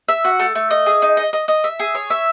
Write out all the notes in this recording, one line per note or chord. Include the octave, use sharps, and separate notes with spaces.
E5
F#4
A3
A3
D#5
G#4
D#4
D#5
D#5
D#5
E5
G#4
C#5
E5